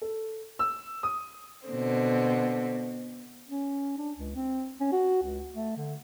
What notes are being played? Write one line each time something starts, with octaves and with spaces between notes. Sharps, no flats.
A4
E6
D#6
B2 D3 C4
C#4
D4
C#2
C4
C#4
F#4
C#2
A3
D3